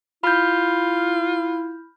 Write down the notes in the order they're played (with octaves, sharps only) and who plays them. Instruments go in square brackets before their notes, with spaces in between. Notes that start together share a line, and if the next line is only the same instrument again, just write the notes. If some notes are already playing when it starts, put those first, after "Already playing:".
[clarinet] E4 [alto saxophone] F4 [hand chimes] B5 F6 G6